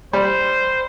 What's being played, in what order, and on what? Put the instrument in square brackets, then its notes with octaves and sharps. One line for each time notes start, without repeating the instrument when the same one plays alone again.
[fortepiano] G3 [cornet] C5